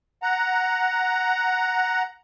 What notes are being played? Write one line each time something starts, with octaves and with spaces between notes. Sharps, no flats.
F#5 A#5